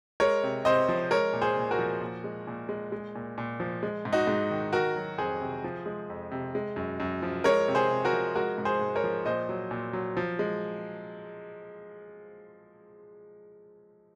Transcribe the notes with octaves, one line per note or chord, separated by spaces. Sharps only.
G#3 A#4 C#5
C3
C3 C5 D#5
F3
G#3 A#4 C#5
A#2
G#4 C5
A#2
F#4 A#4
F3
A#2
G#3
A#2
G#3
G#3
A#2
A#2
F3
G#3
G#2
D#4 F#4
G#2
D#3
D#3 F#4 A#4
F#3
F2 G#4 C5
C3
F3
G#3
F2
C3
G#3
F#2
F#2
F3
G#3 A#4 C#5
C3
G#4 C5
C3
F#4 A#4
F3
G#3 F#4 A#4
G#2
G#4 C5
G#2
A#4 C#5
F3
A#2 C5 D#5
F#3
A#2
F#3
F3
G#3